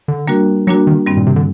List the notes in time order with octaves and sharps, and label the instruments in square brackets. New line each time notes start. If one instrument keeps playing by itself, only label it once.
[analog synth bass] D3
[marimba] G3 A#3 D4 F#4 A#4
[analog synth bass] F#3 [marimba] G3 A#3 D4 F#4 A#4
[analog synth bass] D#3
[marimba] G2 D#3 G3 C4
[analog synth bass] A#2
C3
D3